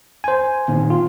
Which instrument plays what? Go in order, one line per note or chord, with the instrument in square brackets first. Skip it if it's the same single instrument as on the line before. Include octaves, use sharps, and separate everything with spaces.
[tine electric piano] C5 G#5
[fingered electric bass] A#2 D#3 C4
[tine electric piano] F4